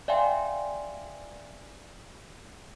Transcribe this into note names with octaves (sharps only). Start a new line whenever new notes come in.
D5 E5 F5 G5 G#5 C6